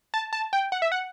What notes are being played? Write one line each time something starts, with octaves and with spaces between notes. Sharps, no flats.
A5
A5
G5
F#5
E5
F#5